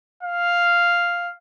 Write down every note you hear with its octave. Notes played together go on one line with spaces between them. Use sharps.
F5